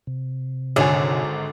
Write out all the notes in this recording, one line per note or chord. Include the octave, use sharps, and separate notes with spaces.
C3
G#1 D3 C#5 G#5